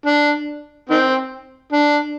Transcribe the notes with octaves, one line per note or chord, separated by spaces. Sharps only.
D4
D#3 C4
D4